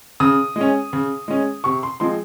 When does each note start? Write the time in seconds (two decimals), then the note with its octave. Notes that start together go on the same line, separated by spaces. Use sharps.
0.20 C#3 D#6
0.56 G#3 C#4
0.93 C#3
1.28 G#3 C#4
1.64 C3 C#6
1.83 C6
2.00 F3 G#3 C4 C6